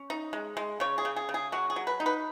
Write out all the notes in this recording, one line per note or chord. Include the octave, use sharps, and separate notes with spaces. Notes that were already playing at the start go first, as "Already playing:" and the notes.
Already playing: C#4
D#4
G#3
G#3
C#3 C#5
G#4
C#3
G#4
C#3
G#4
F#3 F#4
G#4
F#3
B4
D#4
B4